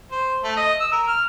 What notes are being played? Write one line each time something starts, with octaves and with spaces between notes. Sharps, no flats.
C5
A3
D#5
E6
A#4
F6